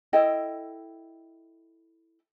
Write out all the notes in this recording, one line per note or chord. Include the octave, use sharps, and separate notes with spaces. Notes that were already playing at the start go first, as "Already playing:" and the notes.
E4 A4 D#5 G5